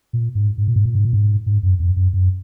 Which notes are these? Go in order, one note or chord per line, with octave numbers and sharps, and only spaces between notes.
A#2
G#2
G#2
A#2
G#2
A#2
G#2
A#2
G#2
G#2
F#2
F2
F#2
F#2